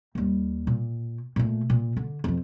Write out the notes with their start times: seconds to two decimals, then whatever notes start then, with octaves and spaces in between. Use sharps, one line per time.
0.15 D#2 G3
0.67 A#2
1.36 A#2 A3
1.70 A#2
1.97 D3
2.24 F2 F3